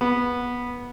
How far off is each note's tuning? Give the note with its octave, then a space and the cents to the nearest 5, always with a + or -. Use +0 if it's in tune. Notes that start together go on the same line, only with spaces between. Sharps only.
B3 -15